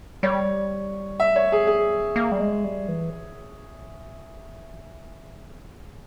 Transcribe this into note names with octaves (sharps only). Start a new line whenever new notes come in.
G3 C#5
E5
C#5
G#4
G#4
A#3
G3
G#3
G3
E3